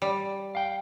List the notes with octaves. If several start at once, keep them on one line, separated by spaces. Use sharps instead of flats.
G3
F5 G5